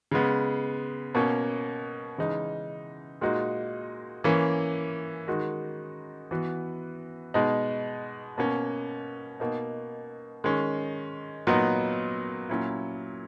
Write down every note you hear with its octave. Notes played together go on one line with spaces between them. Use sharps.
C#3 G#3 B3
B2 A#3 C#4
C#3 E3 G#3 D#4
A#2 G#3 D#4 F#4
E3 A#3 C#4
D#3 G#3 D#4 F#4
E3 B3 F#4
B2 G#3 D#4
B2 A#3 C#4
B2 A#3 D#4
D#3 G#3 C#4
A#2 F#3 B3 D#4
A#2 F#3 C#4 E4